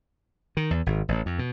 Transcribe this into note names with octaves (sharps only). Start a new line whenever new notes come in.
D#3
E2
G#1
A1
F2
B2